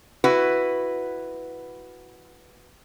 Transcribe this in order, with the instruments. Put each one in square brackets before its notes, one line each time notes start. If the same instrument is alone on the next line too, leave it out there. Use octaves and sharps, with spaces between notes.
[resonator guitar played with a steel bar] E4 F#4 B4